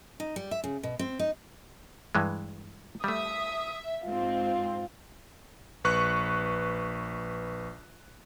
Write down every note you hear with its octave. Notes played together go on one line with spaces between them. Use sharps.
D#4
G3
E5
C#3
B2
C4
D#4
G2 E3 G#3
G3 A3 E5 D#6
G#2 C4 F4
A#1 B4 C#6 F#6